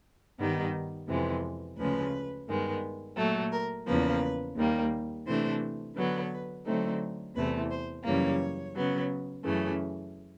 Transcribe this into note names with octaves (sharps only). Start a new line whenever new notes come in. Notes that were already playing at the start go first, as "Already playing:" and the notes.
G2 D#3 G3 B3 D#4
F2 C3 E3 G#3 B3
D2 C#3 F3 G#3 B4
G2 D#3 G#3 B3
A#2 F#3 A3 A4
A#4
E2 C#3 F3 A#3 B4
D#2 D#3 G3 A#3
C3 E3 A3 D4 C5
D3 F#3 B3 B4
D3 F#3 A3 C4 D#4
E2 C3 E3 A3 B4
C5
F#2 C#3 E3 G3 A#3 C#5
C#3 F#3 B3
F#2 C#3 E3 A3